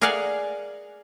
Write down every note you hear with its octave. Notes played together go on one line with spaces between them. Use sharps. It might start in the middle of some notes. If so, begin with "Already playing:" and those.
G#4 A#4 D5 F5 F#5 G#5